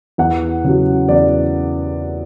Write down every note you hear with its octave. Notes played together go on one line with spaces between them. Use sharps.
E2 F#5
C#3 F#3
E2 D5